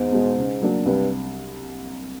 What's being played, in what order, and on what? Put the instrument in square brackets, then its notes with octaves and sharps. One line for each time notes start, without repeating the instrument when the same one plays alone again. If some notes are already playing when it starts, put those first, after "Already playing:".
Already playing: [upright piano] E2 [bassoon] G#2
[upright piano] B2 G#3
C#3
F#3 A#3 D4
[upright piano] C2 [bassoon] G2